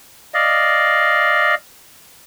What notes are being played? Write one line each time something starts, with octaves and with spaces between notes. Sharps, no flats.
D5 D#5 F5